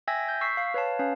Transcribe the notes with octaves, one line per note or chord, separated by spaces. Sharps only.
E5 G5 G#5 E6 G#6 A#6
G6
C#6 E6 B6 C7
F5
B4 C#5 F5 A5
C#4 B4 F5